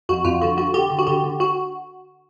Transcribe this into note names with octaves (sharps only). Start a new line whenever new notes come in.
F2 F#4
F2 F4
D3 F#4
D3 F#4
D3 G4
D3
F#4
D3 G4
D3
F#4